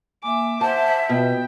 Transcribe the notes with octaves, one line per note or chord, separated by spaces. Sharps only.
A#3 E5 G#5 D6
C5 E5 F#5 A5
B2 F4 F#4 G5